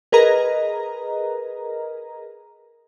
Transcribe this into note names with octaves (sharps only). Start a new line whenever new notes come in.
G#4 A#4 B4 D#5 A#5